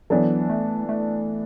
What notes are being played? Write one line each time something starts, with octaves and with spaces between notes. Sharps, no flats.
E3 F#3 B3 D4 A4
A3
A3